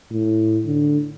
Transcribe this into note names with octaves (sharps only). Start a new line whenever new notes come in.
A2
D3